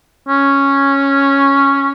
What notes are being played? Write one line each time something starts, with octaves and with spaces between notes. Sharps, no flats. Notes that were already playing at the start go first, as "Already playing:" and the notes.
C#4